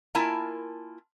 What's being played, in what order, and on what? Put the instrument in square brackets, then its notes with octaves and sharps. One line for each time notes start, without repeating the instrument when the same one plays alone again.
[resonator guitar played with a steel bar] A#3 E4 F4 A#4 G#5 A5